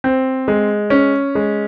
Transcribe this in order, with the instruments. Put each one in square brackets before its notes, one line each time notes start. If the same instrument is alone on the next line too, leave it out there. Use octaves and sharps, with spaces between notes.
[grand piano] C4
G#3
C#4
G#3